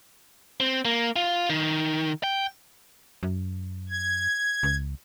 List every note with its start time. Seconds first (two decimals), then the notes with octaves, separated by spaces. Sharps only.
0.60 C4
0.85 A#3
1.16 F4
1.50 D#3
2.24 G5
3.23 F#2
3.90 G#6
4.63 C#2